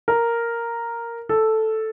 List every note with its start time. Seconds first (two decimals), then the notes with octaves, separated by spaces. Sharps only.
0.08 A#4
1.29 A4